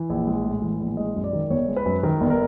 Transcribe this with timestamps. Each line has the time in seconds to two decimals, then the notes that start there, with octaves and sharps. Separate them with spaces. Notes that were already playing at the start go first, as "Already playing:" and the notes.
Already playing: E3
0.10 A#1
0.27 G#3
0.45 A2
0.62 E3
0.80 A#1
0.97 G#3 D#5
1.15 F#2
1.24 D5
1.33 D#3
1.50 G1 C#5
1.68 G#3
1.76 B4
1.86 F#2
2.03 D#3 A#4
2.21 G1
2.30 A#4